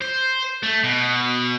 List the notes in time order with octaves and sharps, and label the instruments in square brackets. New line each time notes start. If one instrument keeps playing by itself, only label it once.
[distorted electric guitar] C5
A3
B2